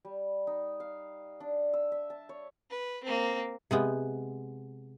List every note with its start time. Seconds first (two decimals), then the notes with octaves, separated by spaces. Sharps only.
0.05 G3
0.47 D#4
0.80 F5
1.40 D4
1.73 E6
1.92 E5
2.10 A5
2.29 C#5
2.70 B4
3.04 A#3 C4
3.71 C3 G#3 B3